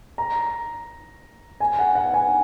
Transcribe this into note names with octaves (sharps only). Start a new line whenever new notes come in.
A#5
G#5
F#5
F#5
G#5